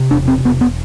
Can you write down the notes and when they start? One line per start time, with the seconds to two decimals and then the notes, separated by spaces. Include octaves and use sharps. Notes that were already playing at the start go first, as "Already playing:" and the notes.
Already playing: C3
0.11 E1 D4
0.28 C4
0.45 E1 B3
0.61 B3